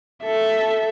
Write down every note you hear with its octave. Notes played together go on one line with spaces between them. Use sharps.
A4 E5